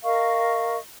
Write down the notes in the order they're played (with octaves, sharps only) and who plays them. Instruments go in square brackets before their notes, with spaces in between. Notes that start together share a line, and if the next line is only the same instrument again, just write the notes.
[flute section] A#4 D#5 F5 C#6